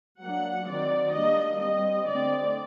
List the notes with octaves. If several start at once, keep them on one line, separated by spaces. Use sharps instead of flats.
F#3 A#3 D4 F#5
D#3 F#3 C4 D5
G3 A#3 D4 D#5
G3 C4 D#5
D3 A3 C4 D5